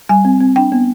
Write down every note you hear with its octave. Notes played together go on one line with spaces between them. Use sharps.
G3 G#5
C4
C4
D4 G5
B3